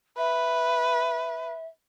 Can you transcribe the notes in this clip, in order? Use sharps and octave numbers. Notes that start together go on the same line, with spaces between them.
B4 E5